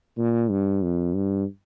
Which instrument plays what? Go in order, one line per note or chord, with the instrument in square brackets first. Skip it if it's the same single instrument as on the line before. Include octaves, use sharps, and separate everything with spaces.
[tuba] A#2
G2
F2
G2